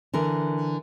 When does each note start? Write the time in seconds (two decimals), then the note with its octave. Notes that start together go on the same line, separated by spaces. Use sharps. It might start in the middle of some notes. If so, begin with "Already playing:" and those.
0.14 D3 E3 A#4